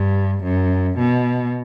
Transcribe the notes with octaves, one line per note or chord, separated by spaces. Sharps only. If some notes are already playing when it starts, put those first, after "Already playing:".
Already playing: G2
F#2
B2